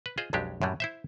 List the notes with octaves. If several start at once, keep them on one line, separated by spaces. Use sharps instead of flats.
B4
F4 G#4 C5 D#5
B1 F2 F#3 G#3 D4 G4
F#2 A2 F#3 G3
E4 C5 E5